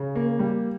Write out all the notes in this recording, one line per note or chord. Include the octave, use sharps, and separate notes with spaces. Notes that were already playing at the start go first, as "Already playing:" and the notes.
Already playing: C#3
A#3
G3